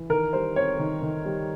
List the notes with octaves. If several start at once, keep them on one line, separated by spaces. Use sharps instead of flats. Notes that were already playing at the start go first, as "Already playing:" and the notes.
Already playing: E3
D#3 A#4
G3 C5
C4 C#5
D#3
D#3
G3